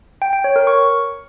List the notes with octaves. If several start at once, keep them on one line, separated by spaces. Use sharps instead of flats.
G5
G5
C#5
A#4
C#6